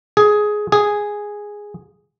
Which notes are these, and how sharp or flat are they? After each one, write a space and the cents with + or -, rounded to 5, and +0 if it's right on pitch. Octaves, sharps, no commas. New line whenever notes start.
G#4 +10
G#4 -5